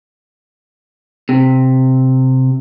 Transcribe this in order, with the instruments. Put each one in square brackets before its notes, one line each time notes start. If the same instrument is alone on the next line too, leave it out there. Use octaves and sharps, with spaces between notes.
[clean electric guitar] C3